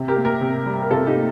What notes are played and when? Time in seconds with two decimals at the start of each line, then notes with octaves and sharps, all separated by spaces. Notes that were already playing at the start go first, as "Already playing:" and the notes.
Already playing: C3
0.08 G4 A#4
0.17 A#3
0.25 G4 A#4
0.41 C3
0.66 G3
0.82 A#4
0.91 C3 F4 A4
1.07 D#4 G4
1.16 A#3